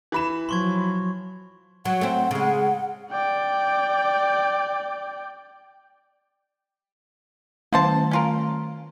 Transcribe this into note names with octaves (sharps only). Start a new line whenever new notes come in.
E3 B5 E7
F3 F#3 C6 C#6 G#6
F#3 F#5
A3 C4
C#3 G#3
D5 G5
D#3 A3 E4 C5 A5
C#4 F4 A#4